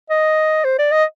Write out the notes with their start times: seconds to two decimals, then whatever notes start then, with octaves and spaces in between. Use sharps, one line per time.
0.10 D#5
0.64 C5
0.79 D5
0.92 D#5